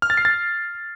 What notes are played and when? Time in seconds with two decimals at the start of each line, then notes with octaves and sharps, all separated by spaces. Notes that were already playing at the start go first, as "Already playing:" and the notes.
0.02 F6
0.10 A6
0.17 C7
0.25 A6